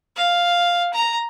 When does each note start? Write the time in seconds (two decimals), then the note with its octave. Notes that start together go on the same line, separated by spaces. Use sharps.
0.16 F5
0.93 A#5